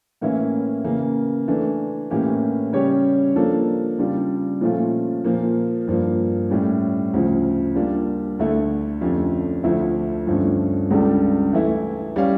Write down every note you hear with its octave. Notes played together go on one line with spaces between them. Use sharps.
A2 E3 A#3 C#4 E4
C#3 E3 A#3
E3 A3 D4
A2 E3 A#3 C#4 G4
C#3 G3 C#4 G4 C#5
F3 A#3 D4 A4
C#3 G3 D4 F4
A#2 F3 A3 C#4 F4
A#2 F3 A#3
G2 F3 A#3
A2 G3 C#4
D2 C#3 F3
G3 A#3 D4 F4
D2 D3 A3 E4
F2 D3 A3 C#4 G4
D2 D3 F3 A3 E4
G2 D3 F3 A3 C#4
C#2 C#3 G3 D4 A4
E3 A3 E4
G3 C#4 G4 C#5 F5